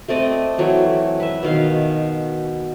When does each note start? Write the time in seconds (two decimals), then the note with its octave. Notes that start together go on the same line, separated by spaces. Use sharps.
0.08 A3 C4 D5 D#5
0.58 E3 F#3 A3
1.20 B4 E5
1.43 B2 D#3 F5